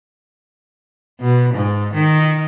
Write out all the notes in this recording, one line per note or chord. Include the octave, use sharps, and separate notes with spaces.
B2
G#2
D#3